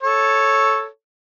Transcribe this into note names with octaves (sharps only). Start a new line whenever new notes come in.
A4 C#5